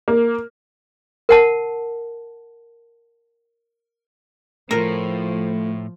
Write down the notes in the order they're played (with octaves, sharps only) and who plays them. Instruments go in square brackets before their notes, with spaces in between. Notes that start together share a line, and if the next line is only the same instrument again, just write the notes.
[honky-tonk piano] A#3
[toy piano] A#4 F#5 A5
[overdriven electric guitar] A2 [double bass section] F3 [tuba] A3 [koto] A#4